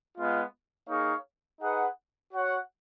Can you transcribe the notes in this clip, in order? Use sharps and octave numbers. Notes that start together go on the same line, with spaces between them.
G#3 B3 F4
A#3 D#4 G#4 C#5 F5
D#4 G#4 B4 F#5
F#4 C#5 F#5